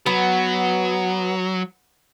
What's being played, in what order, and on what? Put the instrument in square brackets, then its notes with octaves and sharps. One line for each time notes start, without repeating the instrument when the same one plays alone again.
[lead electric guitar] F#3 [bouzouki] B3